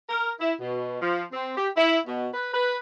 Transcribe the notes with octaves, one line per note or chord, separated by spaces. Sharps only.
A#4
E4
B2
F3
C4
G4
E4
B2
B4
B4